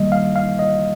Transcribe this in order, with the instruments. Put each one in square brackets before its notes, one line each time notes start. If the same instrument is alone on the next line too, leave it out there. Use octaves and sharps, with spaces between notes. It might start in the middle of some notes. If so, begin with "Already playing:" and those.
Already playing: [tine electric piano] D#3 G3 A#3 D#5
F5
F5
D#5